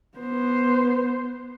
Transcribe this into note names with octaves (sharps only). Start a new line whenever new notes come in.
B3 C5